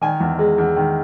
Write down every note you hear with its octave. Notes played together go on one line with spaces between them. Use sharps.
D#3 G#5
E2
G#3
E2
D#3